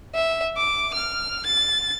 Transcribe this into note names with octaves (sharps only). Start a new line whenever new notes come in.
E5
D6
F6
A6